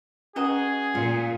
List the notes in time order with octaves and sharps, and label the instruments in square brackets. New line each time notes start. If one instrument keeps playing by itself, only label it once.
[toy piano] C#4 B4 A#5 [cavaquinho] F#4 D#5 [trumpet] G#4
[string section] A#2 [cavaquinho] F4